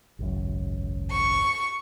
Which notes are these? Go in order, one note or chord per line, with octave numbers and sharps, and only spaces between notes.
G#1 C#2 F#2
C#6